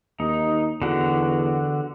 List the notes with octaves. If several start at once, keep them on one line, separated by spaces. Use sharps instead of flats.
D#2 D#4
E2 D3 F#4